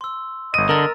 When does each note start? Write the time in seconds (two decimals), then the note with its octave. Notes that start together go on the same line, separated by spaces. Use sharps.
0.01 C6 E6
0.54 G1 D#5 D#7
0.69 D3 A#4 A#5 E6 A6